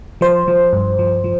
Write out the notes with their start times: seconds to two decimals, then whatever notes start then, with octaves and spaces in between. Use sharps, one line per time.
0.21 F3 C5
0.48 F3
0.73 G2
0.99 F3
1.24 F3